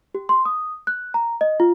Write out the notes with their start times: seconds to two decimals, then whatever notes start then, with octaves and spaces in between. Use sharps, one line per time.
0.15 G4
0.29 C6
0.45 D#6
0.87 F#6
1.14 A#5
1.41 D#5
1.60 F4